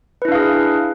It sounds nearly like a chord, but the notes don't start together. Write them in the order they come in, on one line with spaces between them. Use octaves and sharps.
B4 E4 D4 F5 G#4